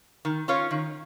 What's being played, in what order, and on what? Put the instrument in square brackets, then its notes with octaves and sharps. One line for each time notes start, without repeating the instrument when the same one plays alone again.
[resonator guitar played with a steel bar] D#3
C#4 F4 C#5
D#3